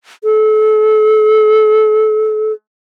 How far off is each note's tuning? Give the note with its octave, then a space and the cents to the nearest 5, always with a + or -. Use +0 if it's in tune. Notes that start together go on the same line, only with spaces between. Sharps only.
A4 -35